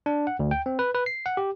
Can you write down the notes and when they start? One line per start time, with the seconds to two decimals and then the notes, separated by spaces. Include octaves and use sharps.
0.06 D4
0.27 F#5
0.39 D2
0.51 G5
0.66 C4
0.79 B4
0.95 B4
1.06 C7
1.26 F#5
1.37 G4